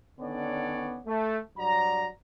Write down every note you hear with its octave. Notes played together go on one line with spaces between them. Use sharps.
D3 D#3 B3 C#4 C#5 D5
A3
G2 F#3 D5 A#5